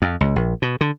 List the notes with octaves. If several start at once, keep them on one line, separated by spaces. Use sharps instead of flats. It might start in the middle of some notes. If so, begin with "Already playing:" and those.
F2
C#2
A#1
B2
D3